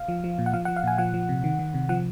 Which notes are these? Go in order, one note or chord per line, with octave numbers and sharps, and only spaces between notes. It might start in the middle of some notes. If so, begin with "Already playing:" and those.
Already playing: F5
F3
F3
A#2
F#5
F3 F5
F#5
F3
F5
A#2 G#5
F3 F#5
F3
C3
D#3
D#3
C3
F3 F#5